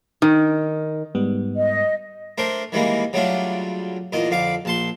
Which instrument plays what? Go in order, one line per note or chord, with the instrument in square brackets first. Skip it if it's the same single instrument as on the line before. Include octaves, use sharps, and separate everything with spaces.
[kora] D#3
[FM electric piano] G#2 G3 B3
[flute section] D#5
[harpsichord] A3 D4 A#4 C5
D#3 E3 G3 G#3 A#3
C#3 F#3 G3 A3 D4 F4
E2 A#2 D#5
F2 D3 F5 D6
A#1 A5 C6